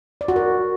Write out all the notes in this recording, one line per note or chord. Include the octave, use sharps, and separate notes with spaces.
D5
F#4
A#4